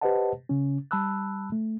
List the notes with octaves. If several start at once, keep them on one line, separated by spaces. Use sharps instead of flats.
G4 B4 C5 D#5 F#5 A5
C#3 C#4
G3 A5 B5 E6 F#6
A3